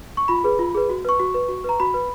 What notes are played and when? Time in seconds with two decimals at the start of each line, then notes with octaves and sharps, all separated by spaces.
0.17 C#6
0.28 F4 B5
0.44 G#4 B4
0.59 F4
0.74 G#4 B4
0.90 F#4
1.05 B4 C#6
1.20 F#4
1.34 B4
1.48 F#4
1.64 B4 A#5
1.80 F#4 B5
1.94 B4